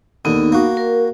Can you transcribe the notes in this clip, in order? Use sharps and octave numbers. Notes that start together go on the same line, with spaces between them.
D#2 D3 B3 D#4
A#3 F#4
A#4